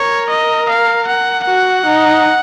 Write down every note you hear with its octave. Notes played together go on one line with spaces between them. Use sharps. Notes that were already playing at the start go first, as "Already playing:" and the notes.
Already playing: A#4 C#5
D#5
F5
F#5
F#4 F#5
D#4